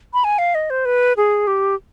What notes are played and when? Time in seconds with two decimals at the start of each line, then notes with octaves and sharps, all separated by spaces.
0.14 B5
0.24 G#5
0.39 F5
0.55 D#5
0.70 C5
0.85 B4
1.17 G#4
1.47 G4